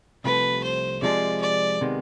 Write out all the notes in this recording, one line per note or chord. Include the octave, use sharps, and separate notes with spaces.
C2 C3 F3 A3 B4
C5
C3 F3 G#3 D5
D5
C3 D#3 G#3 B3